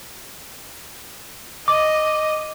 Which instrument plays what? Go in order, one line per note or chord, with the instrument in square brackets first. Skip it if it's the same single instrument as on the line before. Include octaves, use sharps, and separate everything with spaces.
[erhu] D#5 [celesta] D6